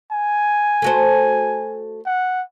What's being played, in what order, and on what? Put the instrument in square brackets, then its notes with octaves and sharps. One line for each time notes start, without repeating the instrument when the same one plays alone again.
[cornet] G#5
[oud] A3 F#4 C5
[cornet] F#5